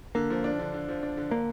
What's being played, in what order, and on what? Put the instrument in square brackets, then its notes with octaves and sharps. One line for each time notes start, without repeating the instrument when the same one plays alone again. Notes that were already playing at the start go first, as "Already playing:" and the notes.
[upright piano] D3 [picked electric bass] A#3
[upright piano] F3
D4
D3
D3
F3
D4
D3
[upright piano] D3 [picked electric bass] A#3